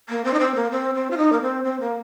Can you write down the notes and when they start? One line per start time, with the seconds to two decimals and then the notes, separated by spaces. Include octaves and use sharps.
0.09 A#3
0.24 C4
0.33 D#4
0.39 C4
0.55 A#3
0.71 C4
0.94 C4
1.10 F4
1.17 D#4
1.32 A#3
1.41 C4
1.64 C4
1.80 A#3